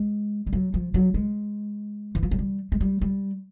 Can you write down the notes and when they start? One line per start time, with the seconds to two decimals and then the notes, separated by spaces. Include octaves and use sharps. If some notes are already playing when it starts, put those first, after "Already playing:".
Already playing: G#3
0.47 G3
0.53 F#3
0.74 F3
0.94 F#3
1.14 G#3
2.15 E3
2.23 F3
2.31 F#3
2.39 G3
2.72 G#3
2.81 G3
3.02 G3